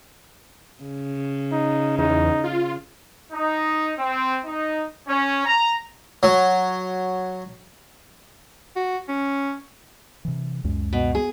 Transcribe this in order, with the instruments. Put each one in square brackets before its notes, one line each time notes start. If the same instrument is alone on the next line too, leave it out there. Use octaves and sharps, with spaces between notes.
[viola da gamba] C#3
[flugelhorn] D#4
[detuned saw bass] E2 [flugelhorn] D#4
[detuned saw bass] F4
[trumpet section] D#4
C4
D#4
C#4
A#5
[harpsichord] F#3
[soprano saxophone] F#4
C#4
[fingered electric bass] C3 E3
C#2 F#2 G#3
[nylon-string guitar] B2
G#4